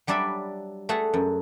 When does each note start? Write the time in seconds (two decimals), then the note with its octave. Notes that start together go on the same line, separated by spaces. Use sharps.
0.07 F#3 G3 D4 D5 E5 B5
0.89 A3 G#4 E5 F#5 A5
1.14 F#2